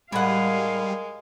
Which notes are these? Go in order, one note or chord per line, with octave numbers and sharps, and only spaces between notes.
A2 G3 G#3 A#4 F5 F#5